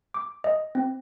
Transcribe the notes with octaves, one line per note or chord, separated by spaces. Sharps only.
D6
D#5
C4